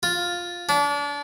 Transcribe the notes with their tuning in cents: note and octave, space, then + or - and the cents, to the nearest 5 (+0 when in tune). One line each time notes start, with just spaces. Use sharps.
F4 +5
D4 -30